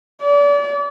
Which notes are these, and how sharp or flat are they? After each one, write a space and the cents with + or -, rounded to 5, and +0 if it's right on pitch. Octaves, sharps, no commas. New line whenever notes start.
D5 -35